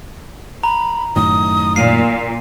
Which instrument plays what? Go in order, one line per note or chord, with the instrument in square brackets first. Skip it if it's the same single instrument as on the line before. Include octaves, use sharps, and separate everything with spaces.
[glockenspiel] A#5 [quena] B5
[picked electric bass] F#2 A2 D#3 [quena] D#6
[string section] A#2 [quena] F5 [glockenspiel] C7 D#7